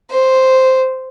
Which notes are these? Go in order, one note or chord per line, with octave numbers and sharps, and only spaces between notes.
C5